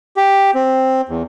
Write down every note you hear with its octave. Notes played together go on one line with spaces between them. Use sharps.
G4
C4
E2